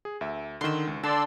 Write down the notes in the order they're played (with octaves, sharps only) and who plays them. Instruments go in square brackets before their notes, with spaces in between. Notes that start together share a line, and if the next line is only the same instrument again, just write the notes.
[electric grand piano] G#4
D2 E5
[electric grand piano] D3 D#3 [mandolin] C6 E6
[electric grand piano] C#2
[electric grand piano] D3 [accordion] D5 C6 E6 [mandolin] A5